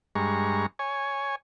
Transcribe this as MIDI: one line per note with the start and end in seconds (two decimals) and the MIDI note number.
0.15 0.66 43
0.15 0.66 56
0.15 0.66 82
0.15 0.66 85
0.79 1.35 73
0.79 1.35 80